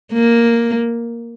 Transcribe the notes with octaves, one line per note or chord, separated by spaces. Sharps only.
A#3